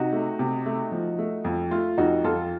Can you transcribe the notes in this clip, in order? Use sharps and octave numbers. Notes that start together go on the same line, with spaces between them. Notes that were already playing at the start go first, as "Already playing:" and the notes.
Already playing: C3 D#4 F#4
A3
C3
A3
F3
A3
F2
A3 F4
F2 D#4 F#4
F2 F4 A4